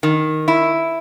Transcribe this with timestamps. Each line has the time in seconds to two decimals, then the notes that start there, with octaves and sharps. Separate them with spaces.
0.03 D#3
0.48 E4